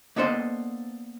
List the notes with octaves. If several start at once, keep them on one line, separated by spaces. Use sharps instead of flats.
A#3 B3 D4 A4 C5 D#5